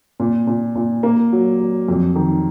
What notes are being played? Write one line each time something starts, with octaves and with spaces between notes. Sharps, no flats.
A#2
A#2
A#2
A#3
F#3
F#3
F2
D#3